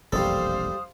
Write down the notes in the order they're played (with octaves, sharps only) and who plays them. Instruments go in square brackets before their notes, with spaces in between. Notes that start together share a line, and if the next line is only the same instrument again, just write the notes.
[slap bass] E1 A#1 F2 [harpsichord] G3 A4 [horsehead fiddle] C5 F5 [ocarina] D#6